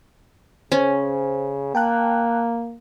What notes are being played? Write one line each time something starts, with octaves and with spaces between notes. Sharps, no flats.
C#3 C#4 C5
A#3 G5 A5 F#6